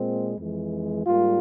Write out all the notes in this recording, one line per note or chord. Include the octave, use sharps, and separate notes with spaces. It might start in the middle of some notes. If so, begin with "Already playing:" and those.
Already playing: A#2 G#3 C4
F2 E3 G#3
G#2 G3 A#3 F4